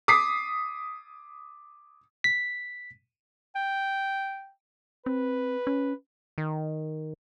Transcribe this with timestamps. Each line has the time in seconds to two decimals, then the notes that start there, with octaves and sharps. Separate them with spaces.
0.08 D6 D#6 B6 C7
2.24 B6
3.55 G5
5.06 C4 B4
5.67 C#4
6.38 D#3